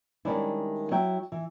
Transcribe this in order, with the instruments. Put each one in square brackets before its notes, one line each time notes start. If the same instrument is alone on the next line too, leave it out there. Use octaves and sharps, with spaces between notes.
[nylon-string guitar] D#3 G3 G#3 C#4 D4 E4
F#3 E4 G5
E3